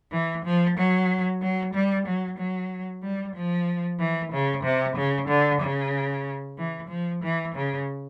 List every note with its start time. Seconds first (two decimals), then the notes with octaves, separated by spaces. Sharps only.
0.12 E3
0.44 F3
0.77 F#3
1.41 F#3
1.73 G3
2.05 F#3
2.37 F#3
3.02 G3
3.35 F3
3.99 E3
4.31 C#3
4.63 C3
4.96 C#3
5.28 D3
5.60 C#3
6.57 E3
6.88 F3
7.21 E3
7.53 C#3